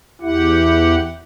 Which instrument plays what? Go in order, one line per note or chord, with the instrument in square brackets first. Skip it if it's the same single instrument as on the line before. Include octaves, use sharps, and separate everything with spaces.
[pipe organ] E2 G4 F#5 [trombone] E4